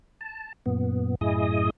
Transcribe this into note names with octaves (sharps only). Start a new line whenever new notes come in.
A5
F#2 A#2 B3
F#2 A2 E4 G#4 D#5 D#6